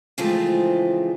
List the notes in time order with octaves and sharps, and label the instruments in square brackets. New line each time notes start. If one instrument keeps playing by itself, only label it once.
[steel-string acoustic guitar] C#3 E3 F3 G#3 A3 C4